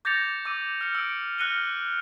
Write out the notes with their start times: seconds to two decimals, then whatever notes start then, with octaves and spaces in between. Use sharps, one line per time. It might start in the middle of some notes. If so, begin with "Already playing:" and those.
0.05 D6 G6 A6 A#6 C#7 F7
0.45 D6 E6 D#7
0.81 F6 C#7
0.95 E6 D7
1.38 F6 F#6 A#6 C#7 D#7 G7